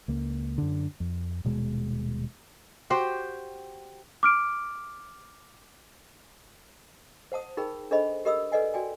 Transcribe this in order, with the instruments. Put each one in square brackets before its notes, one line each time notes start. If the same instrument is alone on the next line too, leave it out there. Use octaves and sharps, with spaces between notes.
[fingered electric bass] C#2 A#3
F#2 D3
F2
D#1 B2 G#3
[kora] F#4 G4 C5 G5
[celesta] D6 F6 D7
[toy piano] C5 F#5 A5 D#6
D#4 G#4 A#4 G5 B5
D4 G#4 A4 C5 D#5 B5
G4 A#4 D#5 B5 D#6 E6
A4 B4 D5 D#5 F#5 G#5
F#4 D5 G5 G#5